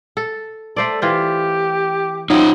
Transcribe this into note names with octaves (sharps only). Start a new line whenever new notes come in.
A4
A3 A4 C5 D5
E3 F4 G4 C5
F#3 C4 D#4 F4